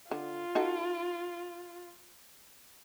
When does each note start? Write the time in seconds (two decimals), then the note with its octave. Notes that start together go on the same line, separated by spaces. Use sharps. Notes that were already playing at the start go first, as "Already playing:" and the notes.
0.11 D3 F4
0.55 D#4 F#4 A4